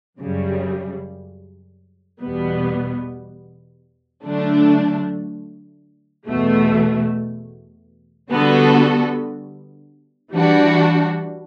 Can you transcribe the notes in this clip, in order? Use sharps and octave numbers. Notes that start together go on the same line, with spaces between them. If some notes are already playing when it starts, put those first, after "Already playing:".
F#2 C#3 G3
E2 B2 G3 B3
D3 F#3 A3 D4
E2 B2 A3
D3 G3 B3 F#4 A4
E3 G3 D4 F#4